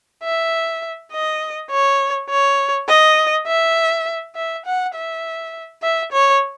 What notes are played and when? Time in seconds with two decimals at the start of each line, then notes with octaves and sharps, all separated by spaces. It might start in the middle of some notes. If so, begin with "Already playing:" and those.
0.23 E5
1.12 D#5
1.70 C#5
2.30 C#5
2.88 D#5
3.47 E5
4.35 E5
4.65 F#5
4.95 E5
5.82 E5
6.12 C#5